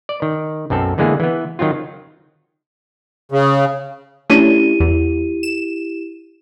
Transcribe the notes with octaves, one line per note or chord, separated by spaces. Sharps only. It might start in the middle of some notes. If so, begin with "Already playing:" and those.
D5
D#3
B1 F#2 C4 A4
D3 E3 G#3 A#3 B3 G#4
E3 B3
D#3 F#3 C4 F4
C#3
A3 C#4 D4 E4 G4 D#7
E2
E7